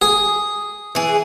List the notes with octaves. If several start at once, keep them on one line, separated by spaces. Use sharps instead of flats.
G#4
E3 G#4